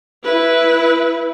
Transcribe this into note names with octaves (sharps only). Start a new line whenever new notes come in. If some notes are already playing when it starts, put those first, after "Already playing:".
E4 B4